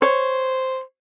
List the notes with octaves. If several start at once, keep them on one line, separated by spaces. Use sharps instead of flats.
C5 C#5